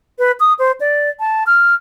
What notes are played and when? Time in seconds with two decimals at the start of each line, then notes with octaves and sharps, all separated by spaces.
0.19 B4
0.40 D#6
0.59 C5
0.80 D5
1.20 A5
1.47 F6